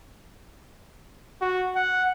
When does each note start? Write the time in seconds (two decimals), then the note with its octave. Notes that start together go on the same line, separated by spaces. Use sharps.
1.41 F#4
1.76 F#5